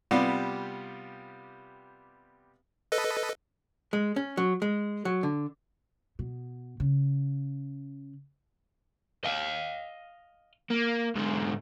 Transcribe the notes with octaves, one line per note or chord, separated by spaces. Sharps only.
C3 G3 B3 F4 G4
A4 B4 D#5
G#3
C#4
F#3
G#3
F#3
D3
B2
C#3
D#5 F5
A#3
G#2 D3